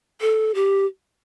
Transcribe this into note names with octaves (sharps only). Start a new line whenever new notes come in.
A4
G4